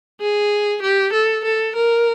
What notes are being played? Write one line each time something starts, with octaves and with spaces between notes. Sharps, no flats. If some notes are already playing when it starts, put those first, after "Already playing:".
G#4
G4
A4
A4
A#4